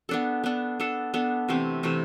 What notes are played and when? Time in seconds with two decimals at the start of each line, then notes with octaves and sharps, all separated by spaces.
0.09 B3 D4 A4
0.44 B3 D4 A4
0.80 B3 D4 A4
1.14 B3 D4 A4
1.49 C3 E3 A3 C4
1.83 C3 E3 A3 C4